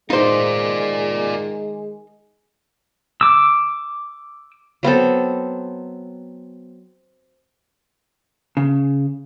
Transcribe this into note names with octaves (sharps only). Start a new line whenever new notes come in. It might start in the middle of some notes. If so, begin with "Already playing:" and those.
D#3 G#3 D#4 F4 C5 D5
D6 E6
F#3 B3 C4 A4
C#3